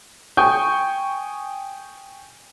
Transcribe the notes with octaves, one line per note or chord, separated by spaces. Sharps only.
G5 G#5 C#6 D#6 G6